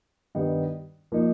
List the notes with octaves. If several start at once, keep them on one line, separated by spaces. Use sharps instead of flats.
G2 D#3 G3 B3 D#4
F3 A#3 D#4